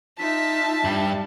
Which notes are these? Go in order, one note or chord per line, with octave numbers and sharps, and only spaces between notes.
D#4 F4 E5 A5 B6
G2 G3